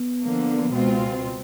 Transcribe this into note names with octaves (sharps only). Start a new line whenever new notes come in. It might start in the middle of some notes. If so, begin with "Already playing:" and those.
Already playing: B3
D3 F3 A#3
C#2 B2 G#3 C4 F4